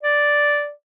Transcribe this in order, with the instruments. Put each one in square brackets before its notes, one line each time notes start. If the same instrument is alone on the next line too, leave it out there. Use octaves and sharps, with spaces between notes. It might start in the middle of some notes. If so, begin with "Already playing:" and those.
[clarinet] D5